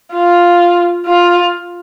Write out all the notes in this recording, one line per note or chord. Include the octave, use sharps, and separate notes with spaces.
F4
F4